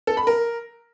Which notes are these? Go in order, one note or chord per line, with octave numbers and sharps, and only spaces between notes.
A4
B5
A#4